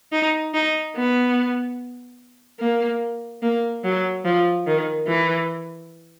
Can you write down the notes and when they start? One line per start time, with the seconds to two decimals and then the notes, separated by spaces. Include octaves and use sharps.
0.12 D#4
0.54 D#4
0.96 B3
2.60 A#3
3.42 A#3
3.84 F#3
4.25 F3
4.67 D#3
5.07 E3